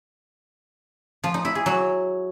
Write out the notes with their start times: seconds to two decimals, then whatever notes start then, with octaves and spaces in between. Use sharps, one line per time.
1.24 F3
1.34 D#4
1.45 E4
1.55 G#4
1.66 F#3